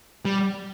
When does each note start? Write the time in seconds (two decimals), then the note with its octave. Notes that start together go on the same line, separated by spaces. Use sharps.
0.25 G3